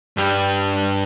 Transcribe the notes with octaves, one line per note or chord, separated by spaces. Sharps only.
G2 G3